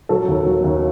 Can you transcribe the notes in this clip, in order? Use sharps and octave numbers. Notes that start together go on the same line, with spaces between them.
F#3 A4
D#2
F#3
D#2